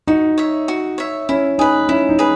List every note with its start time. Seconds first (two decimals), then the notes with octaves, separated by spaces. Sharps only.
0.07 D#4 F#4
0.38 C#5 E5
0.68 F#4
0.98 C#5 E5
1.29 C#4 E4
1.58 D#4 G#4 B4
1.89 C#4 E4
2.09 D#4
2.19 G#4 B4